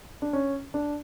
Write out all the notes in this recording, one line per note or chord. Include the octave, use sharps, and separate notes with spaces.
D4
C#4
D4